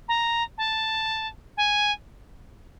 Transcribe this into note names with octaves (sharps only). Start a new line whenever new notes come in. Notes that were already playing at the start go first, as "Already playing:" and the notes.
A#5
A5
G#5